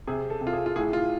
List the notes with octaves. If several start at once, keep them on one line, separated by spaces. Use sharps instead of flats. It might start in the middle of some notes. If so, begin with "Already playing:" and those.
C3 G#4
A4
C3
F4
G#4
F4
A2 G#4
F4